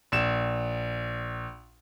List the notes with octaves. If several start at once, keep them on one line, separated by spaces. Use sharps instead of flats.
A#1 E7